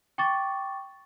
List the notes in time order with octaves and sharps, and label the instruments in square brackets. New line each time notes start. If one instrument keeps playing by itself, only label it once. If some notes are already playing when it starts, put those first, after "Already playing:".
[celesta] G5 C#6 D6 A6